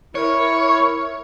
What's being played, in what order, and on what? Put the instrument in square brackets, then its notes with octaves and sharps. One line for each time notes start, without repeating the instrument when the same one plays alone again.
[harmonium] E4 [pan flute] A#4 [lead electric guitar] C#5